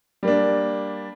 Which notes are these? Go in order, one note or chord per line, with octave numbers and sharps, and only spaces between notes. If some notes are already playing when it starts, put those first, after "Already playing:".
G3 A#3 D4